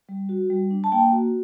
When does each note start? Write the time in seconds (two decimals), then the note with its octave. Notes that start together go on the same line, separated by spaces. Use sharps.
0.09 G3
0.29 F#4
0.50 G3
0.71 D4
0.84 A5
0.92 A#3 G5
1.12 F#4